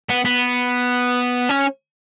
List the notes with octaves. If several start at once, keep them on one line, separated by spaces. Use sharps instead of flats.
B3
B3
C#4